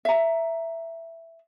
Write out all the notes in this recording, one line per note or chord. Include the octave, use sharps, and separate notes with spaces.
E5 A#5